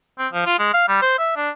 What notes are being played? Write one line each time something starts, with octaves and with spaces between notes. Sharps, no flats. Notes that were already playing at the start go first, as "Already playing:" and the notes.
C4
F3
F4
G#3
F5
G3
C5
E5
D4